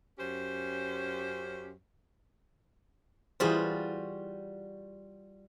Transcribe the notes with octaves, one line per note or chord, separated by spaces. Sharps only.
F#2 C#4 G4 C5
E3 G3 F4 F#4 G#4 C5